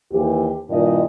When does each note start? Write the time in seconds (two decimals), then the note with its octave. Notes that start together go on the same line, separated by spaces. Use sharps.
0.12 D#2 E3 G4
0.70 G2 A#2 D#3 E4 D#5